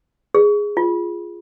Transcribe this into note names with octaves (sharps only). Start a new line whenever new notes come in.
G#4
F4